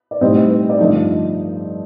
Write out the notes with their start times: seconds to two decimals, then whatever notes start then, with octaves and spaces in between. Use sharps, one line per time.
0.11 D5
0.21 A2 G3 C4 D#4 D#5
0.36 D#5
0.50 C5
0.69 D5
0.78 G2 D3 F3 A3 D#4 D#5